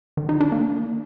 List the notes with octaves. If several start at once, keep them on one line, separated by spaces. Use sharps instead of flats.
D#3
D#4
D4
A#3